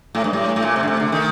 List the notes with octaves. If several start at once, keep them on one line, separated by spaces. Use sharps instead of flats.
A2 A3
G2
A2 G3
A3
A2
A#2
C3
D3
C3
D3
D#3